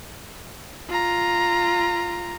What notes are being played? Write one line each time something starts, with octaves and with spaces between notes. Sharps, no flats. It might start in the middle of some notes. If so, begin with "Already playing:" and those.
F4 A#5